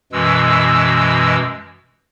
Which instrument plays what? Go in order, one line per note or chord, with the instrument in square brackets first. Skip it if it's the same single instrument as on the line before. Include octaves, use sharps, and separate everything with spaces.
[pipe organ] F#2 B2 E3 G#3 E6